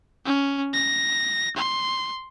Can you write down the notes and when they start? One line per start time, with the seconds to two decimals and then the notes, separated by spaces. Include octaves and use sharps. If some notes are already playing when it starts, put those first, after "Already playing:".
0.25 C#4
0.74 A#6
1.57 C6